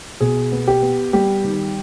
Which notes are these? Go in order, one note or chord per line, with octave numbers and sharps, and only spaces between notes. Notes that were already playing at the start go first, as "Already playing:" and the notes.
B2 G#4
B3
G4
B3
G3 G4
D#3